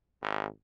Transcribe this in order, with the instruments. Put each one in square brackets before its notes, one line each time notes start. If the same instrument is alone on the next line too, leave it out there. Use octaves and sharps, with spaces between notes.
[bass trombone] G#1